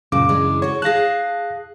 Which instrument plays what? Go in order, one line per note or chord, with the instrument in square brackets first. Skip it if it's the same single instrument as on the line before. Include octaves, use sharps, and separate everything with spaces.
[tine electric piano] F#2 C#3 D6 [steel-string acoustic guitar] A#2
[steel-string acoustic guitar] E3 G#3 D4
[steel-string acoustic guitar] F#4 A4 [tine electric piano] C#5
[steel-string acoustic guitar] G#4 F5 A5 [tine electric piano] F#6 A#6